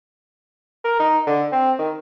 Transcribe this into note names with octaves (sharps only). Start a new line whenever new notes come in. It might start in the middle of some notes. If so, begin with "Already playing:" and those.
A#4
D#4
D3
C4
D#3